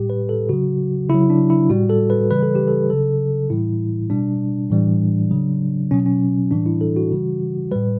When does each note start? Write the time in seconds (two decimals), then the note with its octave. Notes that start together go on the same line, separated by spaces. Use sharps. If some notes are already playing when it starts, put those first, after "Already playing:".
Already playing: A2 G3 G4
0.10 B4
0.29 A4
0.49 C#3 F#3 F#4
1.09 C#3 F#3 E4
1.30 D4
1.50 E4
1.70 A2 G3 F#4
1.90 A4
2.10 B4
2.30 C#3 E3 G3 B4
2.43 A4
2.55 G4
2.68 A4
2.90 C#3 F#3 A4
3.50 A2 E3 G3 E4
4.10 B2 G3 D4
4.70 A2 E3 G3
5.31 C#3 F#3
5.91 B2 C#4
5.94 F#3
6.06 C#4
6.51 A2 E3 G3 D4
6.66 E4
6.81 A4
6.96 F#4
7.11 C#3 E3 G3
7.72 A2 G3 B4